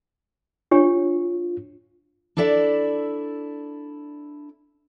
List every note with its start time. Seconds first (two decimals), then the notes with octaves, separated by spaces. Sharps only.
0.71 D4 F4 G4 C#5
2.37 D4 E4 A4 D5 E5